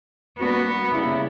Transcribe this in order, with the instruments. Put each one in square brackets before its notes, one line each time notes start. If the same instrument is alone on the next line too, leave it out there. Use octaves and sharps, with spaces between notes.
[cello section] G3 A#3 D4 F#4 [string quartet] B3
[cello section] C#3 G3 A#3 E4